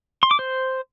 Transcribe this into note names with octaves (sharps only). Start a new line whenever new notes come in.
C6
D6
C5